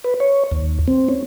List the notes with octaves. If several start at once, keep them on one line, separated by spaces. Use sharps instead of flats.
B4
C#5
D#2
C4
C#4